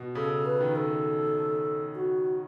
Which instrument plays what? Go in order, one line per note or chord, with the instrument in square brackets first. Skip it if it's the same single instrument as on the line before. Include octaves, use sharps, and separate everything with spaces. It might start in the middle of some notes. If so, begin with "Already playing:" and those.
Already playing: [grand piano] B2
[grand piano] C#3 [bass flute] A4
[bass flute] B4
[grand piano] D#3
[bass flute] A4
F#4